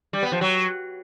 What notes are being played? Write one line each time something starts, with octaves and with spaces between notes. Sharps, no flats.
G3
B3
F3
F#3